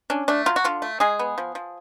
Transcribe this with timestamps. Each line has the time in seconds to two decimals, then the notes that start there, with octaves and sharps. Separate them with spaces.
0.10 C#4 D4
0.28 A3 D4
0.46 F#3 F4
0.56 F#4
0.64 D3 F4
0.82 A3
1.00 G#3 G#4
1.19 B3
1.38 F3
1.55 F3